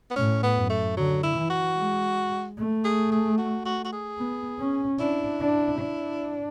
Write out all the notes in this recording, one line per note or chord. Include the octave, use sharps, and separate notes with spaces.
B3
A2 C#4
B3
F#2
A3
D3 F#3
E4
E3
F#4
G#3
A3
G#4
G#4
F#4
F#4
F#4
G#4
B3
C#4
D4 E4
D4
D4